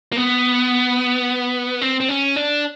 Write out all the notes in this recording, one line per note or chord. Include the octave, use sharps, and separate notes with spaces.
A#3
B3
C4
C4
C#4
D4